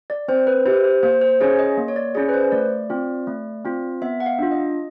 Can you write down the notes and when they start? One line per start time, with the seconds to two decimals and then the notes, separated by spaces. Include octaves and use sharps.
0.10 D5
0.28 C4 C5
0.47 B4
0.66 E4 G4 C5
0.84 C5
1.03 A#3 C5
1.21 C5
1.40 C#4 E4 G#4 C#5
1.59 D#5
1.77 A#3
1.88 C#5
1.96 D5
2.15 C#4 E4 G#4 D5
2.29 B4
2.34 C5
2.52 A3 D5
2.90 C4 F4
3.27 A3
3.65 C4 F4
4.02 B3 E5
4.20 F#5
4.26 F5
4.39 D4 F4
4.51 D#5